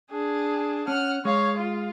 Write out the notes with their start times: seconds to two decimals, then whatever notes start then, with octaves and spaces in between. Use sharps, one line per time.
0.11 D4 G#4
0.88 C#4 F#5 F6
1.25 G#3 C#5 F5
1.57 F4